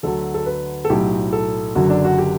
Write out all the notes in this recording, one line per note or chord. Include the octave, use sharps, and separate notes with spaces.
D2 D3 F#3 A4
A4
B4
A4
B1 A2 F#3 G4
A4
F#1 F#2 D3 F#3 F#4
D4
F#4
G4